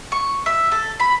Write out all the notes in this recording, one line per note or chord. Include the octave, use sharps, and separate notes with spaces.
C#6
E5
A4
B5